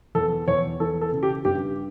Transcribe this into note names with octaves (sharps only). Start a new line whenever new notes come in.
E2 A4
E2 C#5
E3 A4
A4
C#3
G4
G2 G4